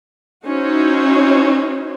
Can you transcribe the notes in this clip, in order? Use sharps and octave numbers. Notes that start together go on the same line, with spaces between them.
C#4 D#4 E4 F#4 C5 C#5